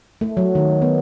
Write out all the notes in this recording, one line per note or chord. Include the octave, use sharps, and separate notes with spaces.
A3
F#3
D#3
B3